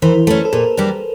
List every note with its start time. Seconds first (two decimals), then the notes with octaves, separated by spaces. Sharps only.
0.02 E3 A#4 C5
0.27 A3 C#4 A4 B4
0.45 A4
0.52 A#2 G#4 A#4
0.77 G3 A#3 D4 G4